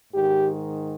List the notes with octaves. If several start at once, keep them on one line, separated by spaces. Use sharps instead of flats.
G#2 D#3 G4